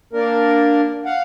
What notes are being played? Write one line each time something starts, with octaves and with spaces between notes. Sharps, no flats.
A#3 D4 A#4
F5 F#5